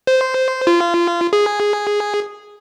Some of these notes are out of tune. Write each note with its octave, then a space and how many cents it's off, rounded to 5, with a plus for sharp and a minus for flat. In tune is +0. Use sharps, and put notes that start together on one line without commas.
C5 -10
F4 -25
G#4 -5